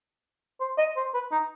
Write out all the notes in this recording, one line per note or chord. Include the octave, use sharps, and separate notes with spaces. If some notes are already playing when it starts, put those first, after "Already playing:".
C5
D#5
C5
B4
D#4